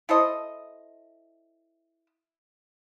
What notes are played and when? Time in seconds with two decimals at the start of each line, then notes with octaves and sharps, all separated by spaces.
0.09 E4 A4 C5 D#5